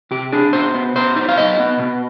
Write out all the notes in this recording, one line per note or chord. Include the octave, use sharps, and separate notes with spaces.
C3 G4
D4 G#4
B2 C5
B3
B2 C5
D#4
F5
B2 D#5
B3
B2